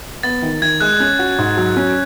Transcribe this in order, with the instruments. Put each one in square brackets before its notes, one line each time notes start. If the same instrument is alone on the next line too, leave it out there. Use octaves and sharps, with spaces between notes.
[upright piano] B3 [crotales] A6
[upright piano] D#3 [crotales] A6
[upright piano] D#3 [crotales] G#6
[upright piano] G#3 [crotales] F#6
[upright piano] C#4 [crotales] F#6
[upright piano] F#4
G#2
F#3
C#4